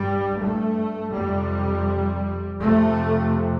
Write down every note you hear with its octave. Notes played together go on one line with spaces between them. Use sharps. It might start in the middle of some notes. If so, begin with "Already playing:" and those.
Already playing: G2 G3
A3
F2 C3 G3
F2 C3 A3